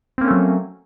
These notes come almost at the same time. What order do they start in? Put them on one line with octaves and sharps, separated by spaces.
C4 A#3 C#4 A3 F#3